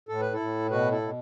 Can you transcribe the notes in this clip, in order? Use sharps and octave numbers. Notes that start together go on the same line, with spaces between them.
A2 A4
B4
E4 A4
A2
B2 F#4 B4
E4 A4
B2